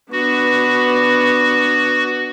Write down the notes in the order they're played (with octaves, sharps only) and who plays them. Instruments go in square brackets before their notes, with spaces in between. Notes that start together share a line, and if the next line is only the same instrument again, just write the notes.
[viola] B3 D4 [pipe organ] F#4